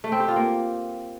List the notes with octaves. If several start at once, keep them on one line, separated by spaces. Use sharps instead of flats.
A3
C4
G4
F4
A#3